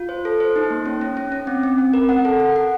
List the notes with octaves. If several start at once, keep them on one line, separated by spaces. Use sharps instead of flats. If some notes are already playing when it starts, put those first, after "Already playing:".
Already playing: F4
C5
A4
C5
D#4
A#3
C#4
C#4
C#4
C#4
C4
C4
C4
A#4
F#5
A4
F#5
F#5